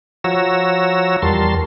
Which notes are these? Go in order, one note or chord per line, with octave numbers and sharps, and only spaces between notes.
F3 F#4 C#5 A#5 E6
E2 G3 A#4 A5 C6